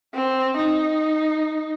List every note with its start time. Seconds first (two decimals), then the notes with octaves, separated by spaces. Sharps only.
0.14 C4
0.57 D#4